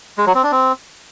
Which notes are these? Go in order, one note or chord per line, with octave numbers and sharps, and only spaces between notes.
G#3
F#3
C4
D4
C4